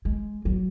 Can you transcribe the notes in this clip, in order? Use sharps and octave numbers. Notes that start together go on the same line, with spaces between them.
G#3
F#3